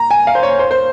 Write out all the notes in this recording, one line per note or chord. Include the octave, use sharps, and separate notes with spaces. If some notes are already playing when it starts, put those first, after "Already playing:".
Already playing: A#5
G#5
F5
C5
C#5
C5
C5